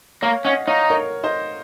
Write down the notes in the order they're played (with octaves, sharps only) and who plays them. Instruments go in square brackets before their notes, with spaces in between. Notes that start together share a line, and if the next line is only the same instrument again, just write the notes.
[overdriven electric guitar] A#3 [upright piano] C#5 F5
[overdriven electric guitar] C#4 [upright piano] D#5 F#5
[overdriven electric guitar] D#4 [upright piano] C#5 F5
[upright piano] A#4 C#5
C5 D#5